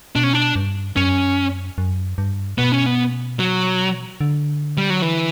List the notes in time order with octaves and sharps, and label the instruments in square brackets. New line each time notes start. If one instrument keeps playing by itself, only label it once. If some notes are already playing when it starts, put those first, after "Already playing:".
[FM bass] B2 [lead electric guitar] D4
[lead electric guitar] C#4
D4
[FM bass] G2
[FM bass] F#2 [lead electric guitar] C#4
[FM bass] F#2
G2
[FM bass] B2 [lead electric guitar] B3
[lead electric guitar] C#4
B3
F#3
[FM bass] D3
[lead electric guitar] G3
F#3
E3